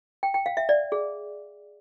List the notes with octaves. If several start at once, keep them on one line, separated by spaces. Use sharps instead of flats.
G5
G5
F5
E5
D5
G#4